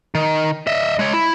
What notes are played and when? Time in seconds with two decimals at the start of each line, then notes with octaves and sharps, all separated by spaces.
0.15 D#3
0.67 D#5 E5
0.99 G#3 C#5
1.13 E4